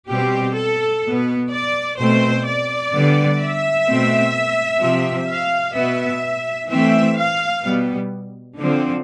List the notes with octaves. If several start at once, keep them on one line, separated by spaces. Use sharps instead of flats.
B2 G3 C4 G4
A4
B2 B3
D5
B2 A3 C4 C5
D5
D3 G3 B3
E5
B2 A3 C4
C3 F3 C4
F5
B2 B3 E5
E3 A3 C4 E5
F5
B2 G3 B3
D3 F3 C4